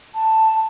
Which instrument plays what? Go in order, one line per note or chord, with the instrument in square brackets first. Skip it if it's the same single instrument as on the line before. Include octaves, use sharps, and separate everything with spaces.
[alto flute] A5